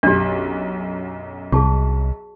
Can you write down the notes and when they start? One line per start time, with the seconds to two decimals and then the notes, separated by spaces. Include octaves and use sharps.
0.03 B1 F#2 D4 G4
1.52 C2 G#4 A5 C#6